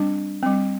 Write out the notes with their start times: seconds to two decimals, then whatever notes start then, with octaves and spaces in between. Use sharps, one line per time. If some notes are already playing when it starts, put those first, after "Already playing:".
Already playing: G3 C4 D4
0.43 G3 C4